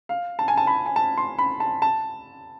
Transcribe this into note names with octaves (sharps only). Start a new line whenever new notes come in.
F5
A5
G#5
A5
B5
G#5
A5
C6
B5
A5
A5